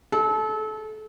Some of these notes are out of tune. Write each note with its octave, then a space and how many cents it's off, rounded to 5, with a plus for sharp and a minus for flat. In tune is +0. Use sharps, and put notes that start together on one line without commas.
A4 -30